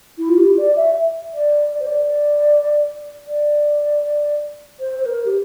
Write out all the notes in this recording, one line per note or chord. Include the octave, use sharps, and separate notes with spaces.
E4
F4
G4
D5
E5
D5
D5
C5
D5
D5
C5
C5
A#4
G4